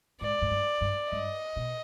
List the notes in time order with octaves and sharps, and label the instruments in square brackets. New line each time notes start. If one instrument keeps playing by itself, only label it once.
[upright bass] G#2 [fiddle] D5
[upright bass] G#2
G2
G2
[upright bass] G2 [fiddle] D#5
[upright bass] B2